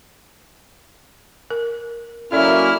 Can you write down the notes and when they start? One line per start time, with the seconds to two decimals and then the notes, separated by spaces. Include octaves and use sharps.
1.50 A#4
2.32 F#3 A#3 C#4 E4 A4 D5 E5 F6